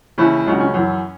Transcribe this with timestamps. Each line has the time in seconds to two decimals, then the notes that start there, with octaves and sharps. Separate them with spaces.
0.18 D#2 C#3 E3 E4
0.46 C#2 C#3 F#3 D#4
0.60 C#4
0.74 F#2 E3